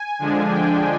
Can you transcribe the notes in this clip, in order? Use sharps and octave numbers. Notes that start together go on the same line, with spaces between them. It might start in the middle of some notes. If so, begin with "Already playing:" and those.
Already playing: G#5
D3 F3 G#3 D4
G5